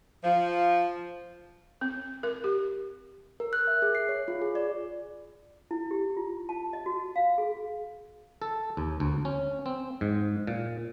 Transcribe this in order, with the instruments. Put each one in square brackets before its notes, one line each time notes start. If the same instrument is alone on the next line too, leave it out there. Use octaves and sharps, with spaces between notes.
[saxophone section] F3
[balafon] C4
A#4
G4
[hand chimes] A#4
F#6
E5
G#4
C7
C#5
F4
G#4
D5
[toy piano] E4
G4
F4
A5
D#5
F#4
F5
G#4
[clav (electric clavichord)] A4
D#2
D2
C#4
C4
G#2
A#2